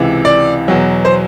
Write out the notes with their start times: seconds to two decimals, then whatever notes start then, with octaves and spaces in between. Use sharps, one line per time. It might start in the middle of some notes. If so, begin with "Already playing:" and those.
Already playing: C#2 C3 E3
0.25 D5
0.68 E2 B2 F#3
1.05 C5